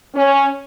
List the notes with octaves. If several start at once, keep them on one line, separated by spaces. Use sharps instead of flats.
C#4